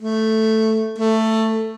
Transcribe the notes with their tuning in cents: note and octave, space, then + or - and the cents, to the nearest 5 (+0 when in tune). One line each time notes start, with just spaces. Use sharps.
A3 +0
A3 +10